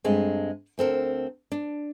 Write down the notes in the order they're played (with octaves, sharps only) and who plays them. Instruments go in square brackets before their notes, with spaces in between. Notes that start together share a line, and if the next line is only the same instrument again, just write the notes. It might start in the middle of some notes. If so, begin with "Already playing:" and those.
[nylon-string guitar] G2 G#3 A3 C4
D2 C4 A4 A#4
D4